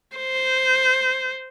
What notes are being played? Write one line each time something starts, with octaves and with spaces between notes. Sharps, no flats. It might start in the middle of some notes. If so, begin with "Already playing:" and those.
C5